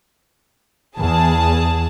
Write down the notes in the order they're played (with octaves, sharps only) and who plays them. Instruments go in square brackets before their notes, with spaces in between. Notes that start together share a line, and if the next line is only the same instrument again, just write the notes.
[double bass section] E2 [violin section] G#4 A5